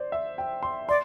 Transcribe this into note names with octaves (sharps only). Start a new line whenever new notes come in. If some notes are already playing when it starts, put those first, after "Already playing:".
Already playing: C5 D5
E5
G5
C6
D5 C6